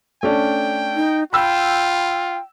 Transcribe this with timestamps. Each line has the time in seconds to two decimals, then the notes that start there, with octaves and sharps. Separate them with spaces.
0.23 A3 C#4 D4 G5
0.95 D#4
1.33 F4 G5 B5 E6